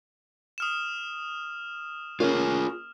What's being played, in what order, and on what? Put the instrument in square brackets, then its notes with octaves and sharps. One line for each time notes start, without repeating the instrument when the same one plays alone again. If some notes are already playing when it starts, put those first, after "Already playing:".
[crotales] D#6 F6 E7
[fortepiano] A#3 C#4 [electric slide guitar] F4 G#4